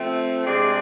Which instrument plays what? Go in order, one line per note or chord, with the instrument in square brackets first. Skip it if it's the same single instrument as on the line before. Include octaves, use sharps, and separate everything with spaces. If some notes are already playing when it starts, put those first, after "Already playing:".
Already playing: [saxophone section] F3 A3 C4
C3 G#3 D4 G#4 D5